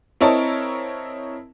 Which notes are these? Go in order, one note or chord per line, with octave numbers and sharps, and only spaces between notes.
C4 E4 A#4 C#5 D#5 A5